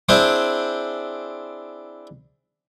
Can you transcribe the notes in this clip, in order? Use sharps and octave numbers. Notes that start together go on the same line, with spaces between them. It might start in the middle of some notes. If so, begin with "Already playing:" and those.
C4 D4 E4 G#4 C5